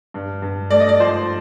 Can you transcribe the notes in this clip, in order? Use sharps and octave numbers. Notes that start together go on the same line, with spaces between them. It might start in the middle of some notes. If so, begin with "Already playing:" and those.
G2
G2
A3 D5
D#5
D5
F3 C5